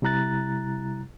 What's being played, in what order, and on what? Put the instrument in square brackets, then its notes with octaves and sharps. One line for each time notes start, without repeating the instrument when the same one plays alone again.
[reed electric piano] C3 G3 E4 A#5 F#6 A6